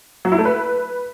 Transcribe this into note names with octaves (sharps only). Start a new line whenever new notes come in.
F#3
E4
A3
B4